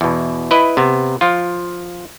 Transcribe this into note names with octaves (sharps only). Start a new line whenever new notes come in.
E2 B2
E4 B4 D#5
C3 B3
F3 F4